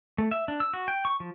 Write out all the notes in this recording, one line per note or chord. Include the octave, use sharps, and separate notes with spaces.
A3
E5
D4
E6
F#4
G5
C#6
F3